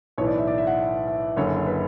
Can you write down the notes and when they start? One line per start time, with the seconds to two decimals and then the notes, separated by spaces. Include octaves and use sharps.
0.18 B1 A2 E3 C#5
0.28 D5
0.38 E5
0.47 D5
0.58 E5
0.67 F#5
1.07 E5
1.37 F#1 F#2 D3 C#5
1.67 B4